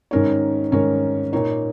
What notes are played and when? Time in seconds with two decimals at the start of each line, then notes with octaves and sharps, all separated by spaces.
0.11 G#2 D#3 C#4 A#4 C#5
0.72 G#2 D#3 C#4 A#4 C#5
1.33 A#2 A#3 D#4 C#5